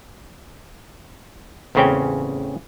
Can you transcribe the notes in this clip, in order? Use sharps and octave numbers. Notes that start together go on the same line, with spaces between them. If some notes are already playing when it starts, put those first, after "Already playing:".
A1 E2 C#3 C4 C#4 G5